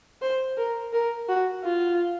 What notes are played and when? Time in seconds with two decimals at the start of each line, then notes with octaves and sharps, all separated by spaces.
0.22 C5
0.57 A#4
0.93 A#4
1.29 F#4
1.64 F4